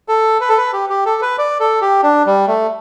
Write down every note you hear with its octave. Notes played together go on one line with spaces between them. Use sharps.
A4
B4
A4
B4
G4
G4
A4
B4
D5
A4
G4
D4
G3
A3